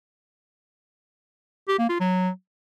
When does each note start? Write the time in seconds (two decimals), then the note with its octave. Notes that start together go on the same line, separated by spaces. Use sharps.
1.68 G4
1.79 A#3
1.89 F4
2.00 F#3